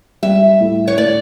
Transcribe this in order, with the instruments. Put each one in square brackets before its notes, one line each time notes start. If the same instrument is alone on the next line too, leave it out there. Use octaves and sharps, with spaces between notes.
[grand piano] G3 [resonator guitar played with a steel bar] E5
[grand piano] A2
[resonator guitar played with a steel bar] C#5
[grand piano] A2 [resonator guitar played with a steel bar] D5